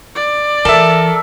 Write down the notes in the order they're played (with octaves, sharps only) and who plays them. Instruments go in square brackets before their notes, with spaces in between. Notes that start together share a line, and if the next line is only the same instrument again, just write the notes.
[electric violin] D5
[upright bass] E3 [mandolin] A4 [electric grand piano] A#4 E5